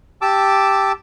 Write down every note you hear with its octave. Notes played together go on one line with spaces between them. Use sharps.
G4 A5 D6 E6